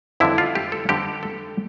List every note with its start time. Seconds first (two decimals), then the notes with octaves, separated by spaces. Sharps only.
0.20 F2 D3 G3 D4 E4
0.38 F4
0.55 G4
0.72 A4
0.89 F2 D3 G3 D4 G4
1.23 A4